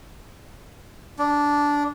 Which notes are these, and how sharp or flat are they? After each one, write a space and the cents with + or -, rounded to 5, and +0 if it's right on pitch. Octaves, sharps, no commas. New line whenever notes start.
D4 -10